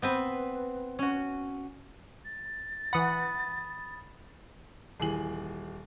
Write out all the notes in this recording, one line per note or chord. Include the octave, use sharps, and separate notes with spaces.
B3 C4 B4
C#4 F#4
A6
E3 F#5 B5 D#6
D#1 E3 G#4 F#7